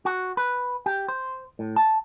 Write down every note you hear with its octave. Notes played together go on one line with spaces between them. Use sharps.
F#4
B4
G4
C5
A2
A5